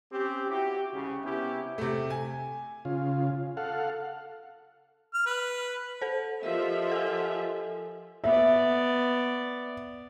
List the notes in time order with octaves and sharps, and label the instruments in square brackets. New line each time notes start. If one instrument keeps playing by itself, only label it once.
[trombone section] C4 C#4 G4
E4 F#4 G4
C2 C#3
C3 B3 C#4 E4 G4
[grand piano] C3 A3
G#5
[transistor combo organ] C#3 F4
A4 F5 F#5
[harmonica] F6
B4
[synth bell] A4 C5
[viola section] F3 F4 E5 [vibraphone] G4 A#4 D#5
[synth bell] A4 G#5
[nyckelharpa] B3 D5 [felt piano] E5